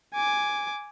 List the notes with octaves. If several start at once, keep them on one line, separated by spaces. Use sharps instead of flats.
G#5 D6